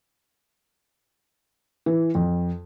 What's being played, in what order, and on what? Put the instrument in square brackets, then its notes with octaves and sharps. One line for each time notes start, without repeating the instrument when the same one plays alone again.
[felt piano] E3
F2